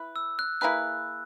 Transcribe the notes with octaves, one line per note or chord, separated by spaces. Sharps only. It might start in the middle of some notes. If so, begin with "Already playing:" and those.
Already playing: E4 B4
E6
F#6
A#3 E4 G#4 B4 F#6